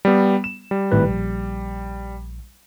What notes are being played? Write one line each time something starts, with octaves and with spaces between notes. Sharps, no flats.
G3 B3
E7
G3
G#1 A2 B4
A#1